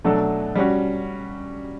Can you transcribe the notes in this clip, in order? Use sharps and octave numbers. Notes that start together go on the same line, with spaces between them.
B2 F#3 A3 D4 A4
G3 C#4 F#4